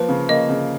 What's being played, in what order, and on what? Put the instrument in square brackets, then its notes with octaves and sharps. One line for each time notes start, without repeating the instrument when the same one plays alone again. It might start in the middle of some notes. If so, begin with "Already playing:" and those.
Already playing: [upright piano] F3 A#3 [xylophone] B4
[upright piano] C#3
[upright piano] A#3 [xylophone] D#5
[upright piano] C#3